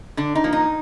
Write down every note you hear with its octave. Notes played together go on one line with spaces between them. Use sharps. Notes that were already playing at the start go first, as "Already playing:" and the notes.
D3 D4
D#4
F3 A#3
D#4